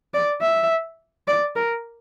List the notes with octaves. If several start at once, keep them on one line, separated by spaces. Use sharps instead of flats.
D5
E5
D5
A#4